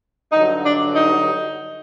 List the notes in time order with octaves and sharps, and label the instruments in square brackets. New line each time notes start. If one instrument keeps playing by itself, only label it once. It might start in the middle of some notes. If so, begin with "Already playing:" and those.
[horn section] G2 D3 F#3 D#4
D4
D#4